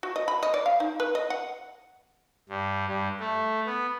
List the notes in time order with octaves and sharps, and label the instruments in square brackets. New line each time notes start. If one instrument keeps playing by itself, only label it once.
[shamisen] F#4
D#5
B5
D#5
D5
F5
D#4
B4
D#5
F#5
[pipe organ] G2
G2
A3
B3